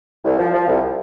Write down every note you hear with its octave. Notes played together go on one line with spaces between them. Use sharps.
C2
F3
F3
C2